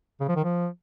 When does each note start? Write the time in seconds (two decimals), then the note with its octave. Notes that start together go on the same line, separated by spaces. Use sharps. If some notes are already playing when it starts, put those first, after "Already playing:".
0.20 C#3
0.28 F3
0.36 D#3
0.44 F3